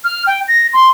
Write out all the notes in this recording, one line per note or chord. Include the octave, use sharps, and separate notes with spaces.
F6
G5
A#6
C6